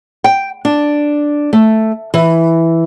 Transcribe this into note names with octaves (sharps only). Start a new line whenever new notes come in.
G5
D4
A3
E3